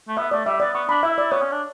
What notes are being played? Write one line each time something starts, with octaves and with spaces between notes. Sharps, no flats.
A3
B3 E5
A3 D5
G3 E5
B3 D5
B3 C#6
D4 B5
E4 E5
D5
B3 C#5
C#4
D4